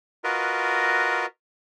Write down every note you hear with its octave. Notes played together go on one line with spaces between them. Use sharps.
F4 F#4 A#4 B4 D#5